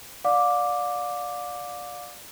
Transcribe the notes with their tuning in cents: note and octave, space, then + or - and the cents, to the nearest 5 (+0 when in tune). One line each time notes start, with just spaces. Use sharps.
D5 +0 F5 +35 D6 +0